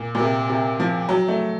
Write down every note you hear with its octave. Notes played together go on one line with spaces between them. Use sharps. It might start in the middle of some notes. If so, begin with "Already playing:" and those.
Already playing: A#2
A#2
C3
C3
F3
F#3
A3